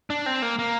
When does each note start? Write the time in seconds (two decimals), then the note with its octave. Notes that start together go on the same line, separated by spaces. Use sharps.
0.10 D4
0.26 C4
0.42 A#3
0.59 A#3